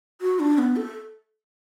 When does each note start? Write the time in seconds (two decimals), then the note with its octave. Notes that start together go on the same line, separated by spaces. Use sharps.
0.21 F#4
0.40 D4
0.58 B3
0.76 A4